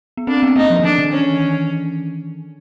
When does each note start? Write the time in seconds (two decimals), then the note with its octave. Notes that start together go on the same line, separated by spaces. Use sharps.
0.17 B3
0.27 C4 D4
0.43 B3
0.56 A#3 D#4
0.70 F3
0.79 D#3
0.84 E3 D4
0.98 D#3
1.12 C#4